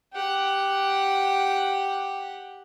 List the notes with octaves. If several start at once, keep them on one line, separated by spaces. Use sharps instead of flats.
G4 F#5